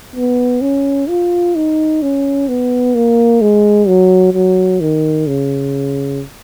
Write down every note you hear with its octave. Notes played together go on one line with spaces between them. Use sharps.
B3
C#4
F4
D#4
C#4
B3
A#3
G#3
F#3
F#3
D#3
C#3